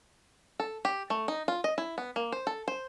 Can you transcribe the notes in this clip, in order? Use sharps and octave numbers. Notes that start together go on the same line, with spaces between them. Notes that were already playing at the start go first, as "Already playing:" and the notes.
A4
G4
A3
D#4
F4
D#5
E4
B3
A#3
C5
A4
C5